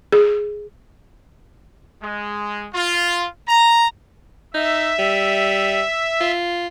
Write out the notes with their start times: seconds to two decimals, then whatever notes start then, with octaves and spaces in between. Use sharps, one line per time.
0.12 G#4
2.03 G#3
2.74 F4
3.48 A#5
4.54 D#4 E5
4.99 G3
6.21 F4